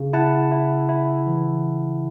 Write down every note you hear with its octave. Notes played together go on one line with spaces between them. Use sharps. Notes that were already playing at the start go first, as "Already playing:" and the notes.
Already playing: C#3
E4 F#5 A5
E4
E4
E3